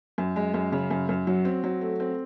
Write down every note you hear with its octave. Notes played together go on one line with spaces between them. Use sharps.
F#2
G#3
F#2
C#3
F#2
F#2
F#3
C4
F#3
A3
C4